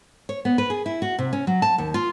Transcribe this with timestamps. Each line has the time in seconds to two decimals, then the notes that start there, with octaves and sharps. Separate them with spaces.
0.29 C#5
0.45 B3
0.58 B4
0.70 G#4
0.86 E4
1.02 F#4
1.19 C3
1.33 C#4
1.47 F#3
1.62 A5
1.78 D#2
1.94 F4